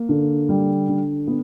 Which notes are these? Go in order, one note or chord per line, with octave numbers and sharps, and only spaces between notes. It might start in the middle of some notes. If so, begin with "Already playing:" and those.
Already playing: A#3
D3
G3
D3
B3